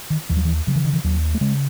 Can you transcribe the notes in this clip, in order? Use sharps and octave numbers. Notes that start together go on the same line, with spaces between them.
D#3
D#2 E3
F#3
E3
C#3 F#3
E3
D#3
E3
D#2 F#3
A3
C#3 G#3